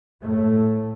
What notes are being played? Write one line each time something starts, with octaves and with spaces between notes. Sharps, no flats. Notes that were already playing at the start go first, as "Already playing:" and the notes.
A2 A3